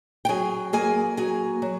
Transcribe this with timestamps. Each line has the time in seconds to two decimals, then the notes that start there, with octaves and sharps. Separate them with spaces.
0.25 G5
0.29 F#3 G#4 G#5
0.73 A#3 G#4 G#5
1.17 F#3 G#4 G#5
1.62 F#3